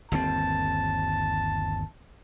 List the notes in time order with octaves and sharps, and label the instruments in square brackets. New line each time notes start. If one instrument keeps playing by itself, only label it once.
[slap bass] G1 D#2 C4 [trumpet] A5